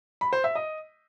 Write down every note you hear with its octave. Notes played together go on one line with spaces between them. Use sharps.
B5
C5
E5
D#5